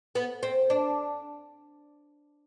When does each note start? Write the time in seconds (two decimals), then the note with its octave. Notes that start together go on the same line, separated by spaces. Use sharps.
0.15 B3
0.43 C4
0.70 D4